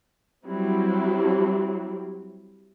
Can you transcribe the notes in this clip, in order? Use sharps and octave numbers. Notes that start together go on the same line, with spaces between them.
F#3 G3 C4 E4